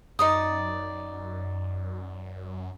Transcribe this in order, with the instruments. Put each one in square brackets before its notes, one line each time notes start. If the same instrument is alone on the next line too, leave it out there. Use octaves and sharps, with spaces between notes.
[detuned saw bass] F#2 [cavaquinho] D#4 D5 D#6